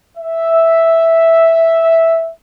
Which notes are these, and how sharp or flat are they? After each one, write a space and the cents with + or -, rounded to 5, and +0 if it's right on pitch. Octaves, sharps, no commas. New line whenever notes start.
E5 -5